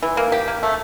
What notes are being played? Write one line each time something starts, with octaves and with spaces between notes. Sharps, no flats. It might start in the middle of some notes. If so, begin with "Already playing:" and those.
E3
A#3
G4
A#3
A3